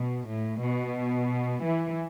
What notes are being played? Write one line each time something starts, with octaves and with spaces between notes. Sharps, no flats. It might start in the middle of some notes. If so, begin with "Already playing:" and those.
Already playing: B2
A2
B2
E3